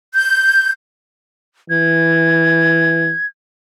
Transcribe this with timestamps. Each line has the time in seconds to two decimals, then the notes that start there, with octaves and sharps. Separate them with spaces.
0.14 G6
1.70 E3 G#6